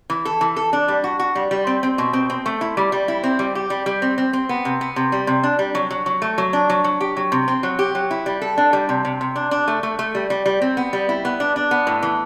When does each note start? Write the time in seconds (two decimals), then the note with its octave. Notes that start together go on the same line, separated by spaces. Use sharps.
0.10 E3
0.25 A4
0.41 E3
0.56 A4
0.73 D4
0.88 G3
1.04 F#4
1.19 F#4
1.35 G3
1.51 G3
1.67 C4
1.83 C4
1.98 B2
2.13 C4
2.30 C4
2.46 A3
2.61 E4
2.77 G3
2.92 G3
3.08 E4
3.24 C4
3.39 G3
3.55 G4
3.70 G3
3.86 G3
4.02 C4
4.18 C4
4.33 C4
4.49 B3
4.65 C3
4.81 B3
4.96 C3
5.12 G3
5.27 C3
5.43 D4
5.59 G3
5.75 F#3
5.91 F#3
6.06 F#3
6.22 A3
6.38 F#3
6.53 D4
6.70 F#3
6.84 F#3
7.01 G4
7.17 F#3
7.32 C3
7.48 C4
7.63 F#3
7.79 G4
7.95 F#3
8.11 E4
8.26 G3
8.42 A4
8.58 D4
8.73 G3
8.89 C3
9.05 C3
9.21 C3
9.36 D4
9.51 D4
9.68 A3
9.83 A3
9.99 A3
10.15 G3
10.30 G3
10.46 G3
10.62 C4
10.77 B3
10.93 G3
11.09 E4
11.25 B3
11.40 D4
11.56 D4
11.71 B3
11.87 A2
12.02 E3